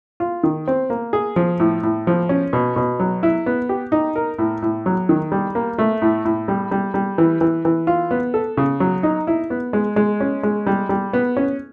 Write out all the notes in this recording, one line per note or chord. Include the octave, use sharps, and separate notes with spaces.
F4
D#3
C4
A#3
G#4
F3
A2
A2
F3
C#4
B2
B2
F#3
E4
B3
G4
D#4
A#4
A2
A2
F#3
D#3
G3
A#3
A3
A2
A2
G3
G3
G3
E3
E3
E3
F4
B3
A4
C#3
F#3
D#4
E4
B3
G#3
G#3
C#4
G#3
G3
G3
B3
C#4